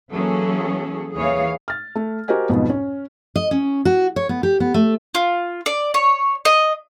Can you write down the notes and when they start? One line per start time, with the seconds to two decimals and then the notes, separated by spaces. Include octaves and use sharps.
0.11 E3 F#3 A#3 C#4 G#4 A4
1.15 D#2 E3 G#4 C#5 F5
1.68 F6 A6
1.95 A3
2.28 F#4 G4 A#4 C5 D#5 G#5
2.49 B1 F2 G#2 B2
2.70 C#4
3.36 D#5
3.51 C#4
3.85 F#4
4.16 C#5
4.29 B3
4.43 G4
4.60 B3
4.74 A3
5.15 F4
5.66 D5
5.94 C#5
6.45 D#5